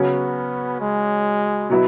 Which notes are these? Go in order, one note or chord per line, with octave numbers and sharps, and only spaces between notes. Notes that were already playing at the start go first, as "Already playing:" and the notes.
Already playing: C#3 F#3 B3 C#4 F#4
G#3
B2 F#3 B3 E4